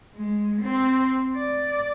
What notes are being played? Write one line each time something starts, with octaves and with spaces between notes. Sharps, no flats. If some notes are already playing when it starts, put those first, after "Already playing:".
G#3
C4
D5